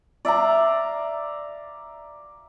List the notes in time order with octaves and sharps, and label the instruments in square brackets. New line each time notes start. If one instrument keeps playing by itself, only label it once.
[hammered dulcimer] D5 E5 F5 A#5